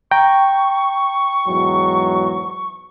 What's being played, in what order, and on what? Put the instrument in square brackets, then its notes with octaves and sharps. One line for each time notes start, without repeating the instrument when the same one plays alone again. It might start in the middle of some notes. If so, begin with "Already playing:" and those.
[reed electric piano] G5 A#5 [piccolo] C#6
[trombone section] E2 G#2 F#3